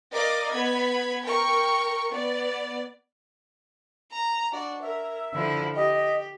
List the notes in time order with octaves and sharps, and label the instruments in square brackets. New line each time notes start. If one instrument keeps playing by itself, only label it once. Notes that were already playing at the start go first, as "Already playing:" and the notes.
[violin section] A#4 D5 D#5 F5 D6
B3 B5 G#6
A#4 G5 C#6
B3 D5
[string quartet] A#5
D4 F#4 D5
[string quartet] A#4 [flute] E5
[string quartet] D3 F3 E4
[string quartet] G4 [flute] D#5